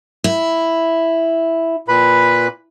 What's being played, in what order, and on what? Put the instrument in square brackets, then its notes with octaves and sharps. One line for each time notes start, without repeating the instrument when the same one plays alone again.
[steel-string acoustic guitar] E4
[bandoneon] A#2 B4 B5